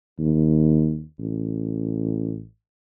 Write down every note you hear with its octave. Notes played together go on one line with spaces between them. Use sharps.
D#2
A1